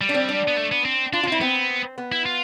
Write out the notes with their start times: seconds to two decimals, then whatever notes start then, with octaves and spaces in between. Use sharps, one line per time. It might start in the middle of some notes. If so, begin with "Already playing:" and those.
0.01 G3
0.09 D4
0.14 C4
0.29 D4
0.48 B3
0.57 A3
0.72 B3
0.85 C4
1.13 D4 F4
1.23 F4
1.28 C4 E4
1.41 B3 C4
1.98 B3
2.12 E4
2.26 F4